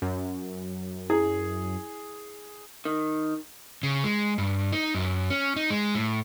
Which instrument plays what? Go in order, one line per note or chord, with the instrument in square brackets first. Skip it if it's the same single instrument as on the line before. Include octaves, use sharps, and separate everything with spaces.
[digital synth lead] F#2
[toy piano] E4 [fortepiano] G#4
[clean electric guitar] D#3
[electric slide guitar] C#3
G#3
G2
D#4
F#2
C#4
D#4
G#3
A2